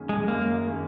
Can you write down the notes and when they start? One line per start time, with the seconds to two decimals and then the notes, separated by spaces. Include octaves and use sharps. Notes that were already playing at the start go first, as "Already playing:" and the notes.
Already playing: F#2 D#3 A#3 C#4 G#4
0.09 G#3
0.28 F#2 A#3
0.66 D#3 A#3 C#4 G#4